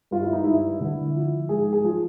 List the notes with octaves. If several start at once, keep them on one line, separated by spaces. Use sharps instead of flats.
G2 F4
E4
D#4
G2 E4
D3
F3
G#2 G#4
G#4
F3